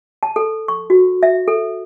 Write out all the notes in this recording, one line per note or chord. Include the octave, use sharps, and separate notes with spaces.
A5
A4
C#6
F#4
E5
A4